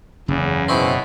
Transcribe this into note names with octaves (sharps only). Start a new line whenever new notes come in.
F#1 E2 C#3
B2 C4 C#4 E4